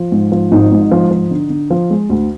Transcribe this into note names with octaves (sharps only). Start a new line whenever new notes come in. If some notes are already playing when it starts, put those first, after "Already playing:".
Already playing: F3
G#2
F3
G#1 D#4
G#2
F3
F3
D3
D3
F3
G#3
D2